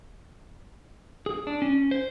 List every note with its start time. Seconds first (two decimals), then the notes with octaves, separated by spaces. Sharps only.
1.26 G#4
1.47 D4
1.62 C#4
1.91 C5